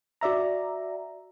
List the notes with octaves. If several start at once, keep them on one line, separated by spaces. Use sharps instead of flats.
F#4 D5 E5 A#5